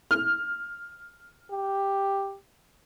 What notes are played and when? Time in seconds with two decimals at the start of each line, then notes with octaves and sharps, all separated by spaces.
0.11 F6
1.51 G4